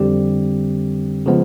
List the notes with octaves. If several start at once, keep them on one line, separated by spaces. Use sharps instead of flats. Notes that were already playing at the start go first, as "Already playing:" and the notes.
Already playing: F2 D3 G3 C4 G4
C#3 F3 G#3 B3